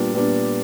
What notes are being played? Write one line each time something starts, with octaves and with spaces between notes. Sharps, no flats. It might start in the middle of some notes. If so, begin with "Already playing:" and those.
Already playing: A#2 G3 B3 D4
A#2 G3 B3 D4